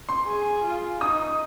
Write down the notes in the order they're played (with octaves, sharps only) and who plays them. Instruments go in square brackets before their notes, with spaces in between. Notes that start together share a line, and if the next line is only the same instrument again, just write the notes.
[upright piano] C6
[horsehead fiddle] G#4
F4
[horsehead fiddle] D#4 [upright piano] D#6